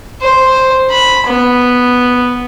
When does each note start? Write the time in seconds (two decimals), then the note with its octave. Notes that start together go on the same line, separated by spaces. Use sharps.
0.22 C5
0.90 B5
1.27 B3